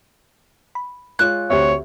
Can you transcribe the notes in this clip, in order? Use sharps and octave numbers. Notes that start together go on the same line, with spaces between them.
B5
G#3 F4 C#5 F#6
D2 C4 G4 C#5 E5